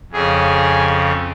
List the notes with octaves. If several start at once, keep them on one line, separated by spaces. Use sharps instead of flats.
F2 C#3 G#4